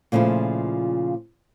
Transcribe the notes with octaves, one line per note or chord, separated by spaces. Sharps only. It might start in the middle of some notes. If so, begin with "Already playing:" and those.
A#2 C#3 F3 A3 E4